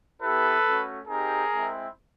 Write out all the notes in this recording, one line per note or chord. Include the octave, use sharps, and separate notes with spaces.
B3 E4 G4 A4 B4
A3 C#4 F#4
C4 D#4 G4 G#4 A#4
G#3 C4 E4